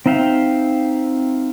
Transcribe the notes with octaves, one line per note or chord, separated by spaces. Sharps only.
C4 D#4 E5 F5 G5